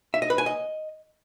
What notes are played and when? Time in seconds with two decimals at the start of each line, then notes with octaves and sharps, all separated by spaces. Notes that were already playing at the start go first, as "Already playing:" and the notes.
0.14 E5
0.22 D#5
0.30 B4
0.38 G#5
0.46 D#5